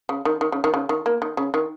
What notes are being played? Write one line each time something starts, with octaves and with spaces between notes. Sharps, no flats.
C#3
D#3
D#3
C#3
D#3
C#3
D#3
A#3
D#3
C#3
D#3